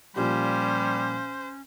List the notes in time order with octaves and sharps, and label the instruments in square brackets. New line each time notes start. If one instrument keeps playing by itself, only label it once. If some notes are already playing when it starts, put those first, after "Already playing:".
[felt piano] A#2 F3 G4 [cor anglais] G3 [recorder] C#4 [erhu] C5